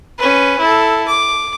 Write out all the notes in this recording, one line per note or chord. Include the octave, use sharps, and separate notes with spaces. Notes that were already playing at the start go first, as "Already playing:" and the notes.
C#4 B4
E4 A4
D6